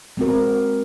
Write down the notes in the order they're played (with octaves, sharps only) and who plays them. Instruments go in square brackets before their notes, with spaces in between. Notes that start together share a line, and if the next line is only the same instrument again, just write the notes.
[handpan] G#3 C4 F#4 A#4